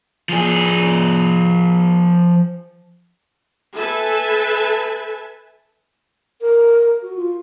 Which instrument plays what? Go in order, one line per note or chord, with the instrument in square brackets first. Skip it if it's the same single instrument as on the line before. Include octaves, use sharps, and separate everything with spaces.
[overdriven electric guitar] F3 G#4
[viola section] A4 B4 E5 G#5 A5
[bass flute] A#4
F#4
F4